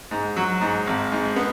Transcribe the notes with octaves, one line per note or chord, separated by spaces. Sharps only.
G#2
F#3
G#2
G#1
G#2
B3